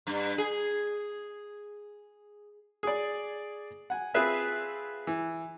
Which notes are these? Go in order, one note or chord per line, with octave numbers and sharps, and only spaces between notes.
G2
G#4
G#4 D5
F#5 G#5
C4 F4 G#4 B4 E5
E3